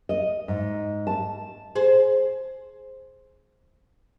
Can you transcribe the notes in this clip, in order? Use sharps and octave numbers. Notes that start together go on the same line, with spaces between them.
D#5
G#2
A5
G#4 C5